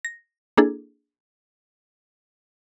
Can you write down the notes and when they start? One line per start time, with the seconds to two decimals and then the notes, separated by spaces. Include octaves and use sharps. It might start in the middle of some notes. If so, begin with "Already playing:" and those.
0.05 A#6
0.57 A#3 D4 E4 G#4 A4